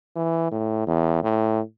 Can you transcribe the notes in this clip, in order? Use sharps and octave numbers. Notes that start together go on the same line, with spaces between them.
E3
A2
E2
A2